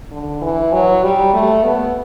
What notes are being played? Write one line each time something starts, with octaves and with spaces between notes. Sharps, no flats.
D3
E3
F#3
G3
A3
B3